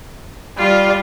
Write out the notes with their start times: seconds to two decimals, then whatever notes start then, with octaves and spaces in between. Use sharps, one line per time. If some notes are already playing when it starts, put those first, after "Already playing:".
0.58 G3 F4